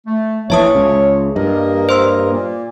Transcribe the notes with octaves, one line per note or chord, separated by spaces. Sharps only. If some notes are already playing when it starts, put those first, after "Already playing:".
A3
A#1 E3 C#5 E5 A5 D#6
C#2 C#3
G2 A#3 A#4 D#5
C5 C6 E6
A#2 A#3